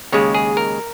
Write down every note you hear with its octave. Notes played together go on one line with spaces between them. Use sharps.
D#2 C#3 G#3 C#5
G#4
A#4